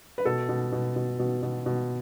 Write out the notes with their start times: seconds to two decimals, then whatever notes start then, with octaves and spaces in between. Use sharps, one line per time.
0.18 B4
0.25 B2 A4
0.49 B2
0.72 B2
0.96 B2
1.19 B2
1.43 B2
1.66 B2